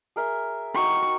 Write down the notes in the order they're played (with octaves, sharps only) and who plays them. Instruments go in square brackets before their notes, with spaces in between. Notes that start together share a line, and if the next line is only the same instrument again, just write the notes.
[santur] G#4 A#4 E5
[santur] D#4 F#4 G5 [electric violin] C#6